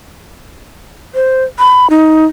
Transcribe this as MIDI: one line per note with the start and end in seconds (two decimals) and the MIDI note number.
1.15 1.44 72
1.59 1.90 83
1.90 2.26 63